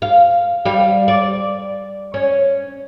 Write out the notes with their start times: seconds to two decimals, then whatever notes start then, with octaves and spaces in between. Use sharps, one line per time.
0.02 F5
0.65 G3 F5
1.08 D5
2.14 C#4